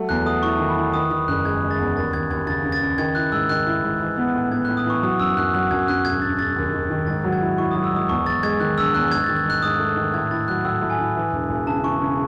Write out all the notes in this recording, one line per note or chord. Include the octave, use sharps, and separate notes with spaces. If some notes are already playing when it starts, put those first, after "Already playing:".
Already playing: F#3 A3
E2 F#6
A3 D#6
E4 C#6
D#3
B5
E4
D#3 D#6
D#3 D#6
F#1 F#6
G#3 G#6
G#3
A6
E2
D#2 A6
D#2 G#6
D#2 G#6
C#3 A6
C#3
A6
C#3
D#3 G#6
E4 F#6
G#2 E6
D#3 F#6
E4
G#2
E3
B3
A2
B3 G#6
F#6
A2
D#6
E3 C#6
F#3 D#6
F#2 E6
F#2 F#6
F#3 F#6
F#2 G#6
F#2 F#6
E1 G#6
E1 A6
E1 A6
D#2
D#3
D#3
G#2 A6
F#3
G#6
E4
E4 C#6
D#6
F#3
E6
G#2 D#6
E2 C#6
E2 A6
G#3 G#6
D#3 F#6
E1 E6
E2 F#6
G#2 G#6
A6
D#3
G#6
G#2 F#6
G#2 D#6
A3
D#3
A2 G#6
E4 A6
F#3 F#6
A2 E6
A2
G#5
E4
E3
E1
E1
C#3 A5
E3 C#6
C#3